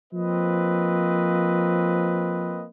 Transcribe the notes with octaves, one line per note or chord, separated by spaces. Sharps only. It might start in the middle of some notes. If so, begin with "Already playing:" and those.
F3 A#3 C4 B4 D#5